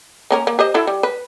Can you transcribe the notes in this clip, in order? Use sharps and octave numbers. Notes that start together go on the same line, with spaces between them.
A#3 C#4 A#4
A#3
G4 C5 D#5
E4 F#4 A4
G3
B4